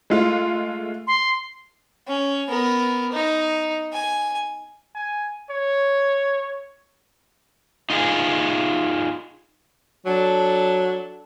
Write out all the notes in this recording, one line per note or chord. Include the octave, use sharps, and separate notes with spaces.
G#3 A3 F4
C6
C#4
B3 A#4
D#4
G#5
G#5
C#5
D#4 F4 G#4
F#3 D4 A4